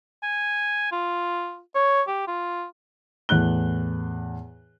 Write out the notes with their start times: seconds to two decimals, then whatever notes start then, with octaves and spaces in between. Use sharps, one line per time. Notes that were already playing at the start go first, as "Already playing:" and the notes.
0.23 G#5
0.92 F4
1.75 C#5
2.08 G4
2.28 F4
3.29 E2 A2 F#6 G7